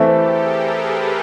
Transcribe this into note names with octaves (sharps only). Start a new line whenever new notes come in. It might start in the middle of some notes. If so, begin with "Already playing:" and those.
Already playing: E3 A3 C4 E4 G4 A4
G#4 A#4
A4 B4
A#4 C5